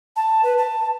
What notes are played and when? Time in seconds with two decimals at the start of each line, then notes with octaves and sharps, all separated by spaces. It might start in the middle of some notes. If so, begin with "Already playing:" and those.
0.16 A5
0.43 B4
0.58 A5